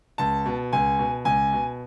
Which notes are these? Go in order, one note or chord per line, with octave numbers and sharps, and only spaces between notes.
C#2 A5
B2
C#2 G#5
B2
C#2 G#5
B2